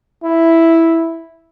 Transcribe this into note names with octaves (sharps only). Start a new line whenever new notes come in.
E4